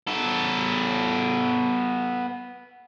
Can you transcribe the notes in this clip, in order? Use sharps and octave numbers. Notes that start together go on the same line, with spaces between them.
B3 A4